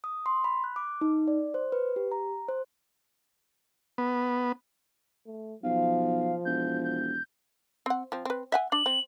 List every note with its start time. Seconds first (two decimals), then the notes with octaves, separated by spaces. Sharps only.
0.04 D#6
0.26 C6
0.44 B5
0.64 F#6
0.76 D6
1.01 D#4
1.28 D5
1.54 C5
1.72 B4
1.96 G4
2.11 A#5
2.49 C5
3.98 B3
5.26 A3
5.63 B1 F3 F5
6.45 E1 G6
6.84 G6
7.86 C4 F#5
8.12 F3 C4
8.25 C4 B4
8.52 E5 F#5 G#5
8.72 D4 F#7
8.86 C4